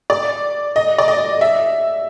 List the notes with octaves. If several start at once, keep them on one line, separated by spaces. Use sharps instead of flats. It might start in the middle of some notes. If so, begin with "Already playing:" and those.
D5
D#5
D5
D#5
E5